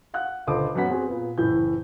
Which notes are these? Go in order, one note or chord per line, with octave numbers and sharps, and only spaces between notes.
F5 F#5 F#6
C#2 D3 A4 C5 D#5 D6
F#2 B3 C#4 F#5 B6
C4 F#4 G#4
A#2 B3
F#1 A2 E3 G6